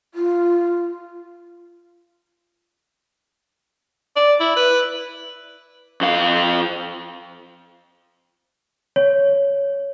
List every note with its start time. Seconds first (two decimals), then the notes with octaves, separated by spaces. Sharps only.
0.14 F4
4.16 D5
4.40 E4
4.56 B4
6.01 F2 F5
8.96 C#5